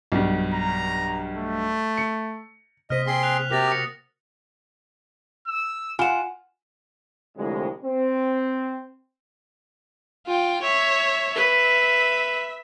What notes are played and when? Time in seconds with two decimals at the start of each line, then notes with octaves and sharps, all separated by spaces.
0.12 B1 G2
0.54 A#5
1.38 A3
1.97 C#7
2.90 C3 A#3 C5 D#5 F6 B6
3.07 C4 G#4 C6
3.23 F#6 F7
3.51 C3 F#4 G4 A#4 A6 A#6 F7
3.68 D#6 C#7
5.47 E6
5.99 F4 F#5 G#5 E7
7.38 C2 F2 A2 D3 G3 G#3
7.85 C4
10.27 F4 G5
10.62 C#5 E5
11.35 B4 E5